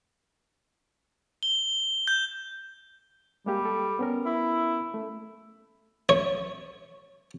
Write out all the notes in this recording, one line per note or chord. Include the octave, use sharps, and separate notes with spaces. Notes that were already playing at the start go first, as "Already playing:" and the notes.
G7
G6
G3 G#3 A#3 G4
A4
B3 C#4 A#4
E4
A3
C#5